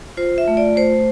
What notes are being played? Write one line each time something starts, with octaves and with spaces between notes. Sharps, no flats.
F4 C5
E5
A3
D5
A3 C5